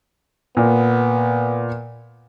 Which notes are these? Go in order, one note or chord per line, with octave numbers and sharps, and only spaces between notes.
A#2 B3